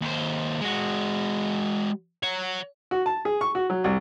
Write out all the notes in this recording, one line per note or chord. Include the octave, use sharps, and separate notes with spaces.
D#2 C5
G#3 F#4
C#5 F#5
F#4
A5
G#4
C#6
F#4
F#3
C2